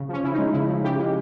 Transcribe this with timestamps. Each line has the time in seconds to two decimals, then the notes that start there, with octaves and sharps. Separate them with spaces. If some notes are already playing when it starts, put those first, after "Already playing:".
Already playing: C#3
0.09 F3 C#4
0.24 C#3 E4
0.34 D#4
0.38 G#3
0.53 C#3 E4
0.69 F3
0.84 C#3 G4
0.99 G#3